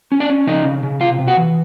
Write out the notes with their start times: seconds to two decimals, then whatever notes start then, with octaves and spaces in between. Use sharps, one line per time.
0.12 C#4
0.20 D4 D5
0.30 C#4
0.47 C#3 D#4 D#5
0.65 C#3
0.83 C#3
1.01 C3 F4 F5
1.19 C3
1.27 F#4 F#5
1.37 E3